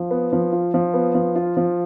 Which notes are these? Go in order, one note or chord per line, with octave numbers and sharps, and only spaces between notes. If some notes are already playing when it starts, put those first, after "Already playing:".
Already playing: F3
B3
F3
F4
F3
B3
F3
F4
F3